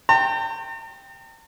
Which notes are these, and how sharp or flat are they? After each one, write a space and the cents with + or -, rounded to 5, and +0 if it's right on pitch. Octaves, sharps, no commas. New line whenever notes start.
G5 +0 A#5 -45